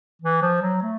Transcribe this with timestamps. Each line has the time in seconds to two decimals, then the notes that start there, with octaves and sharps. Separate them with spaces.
0.22 E3
0.42 F3
0.62 F#3
0.82 A3